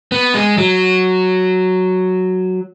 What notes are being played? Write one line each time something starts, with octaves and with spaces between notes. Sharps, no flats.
B3
G#3
F#3